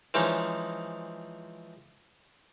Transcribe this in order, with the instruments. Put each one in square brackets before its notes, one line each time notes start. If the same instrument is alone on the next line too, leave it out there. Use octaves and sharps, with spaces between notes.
[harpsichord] E3 F3 G#3 C#4 D#4